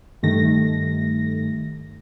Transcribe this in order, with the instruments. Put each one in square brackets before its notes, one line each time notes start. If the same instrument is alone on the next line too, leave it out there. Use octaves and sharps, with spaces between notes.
[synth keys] G2 D#3 A3 A#6